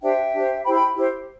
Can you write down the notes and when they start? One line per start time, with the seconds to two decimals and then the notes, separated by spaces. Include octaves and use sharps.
0.02 D4 G4 C5 E5 G5
0.33 D4 G4 C5
0.64 E4 G4 C5 G5 B5
0.74 G5 B5
0.94 E4 G4 C5